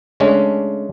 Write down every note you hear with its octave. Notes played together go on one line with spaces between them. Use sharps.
C#3 G#3 A3 C#4 D4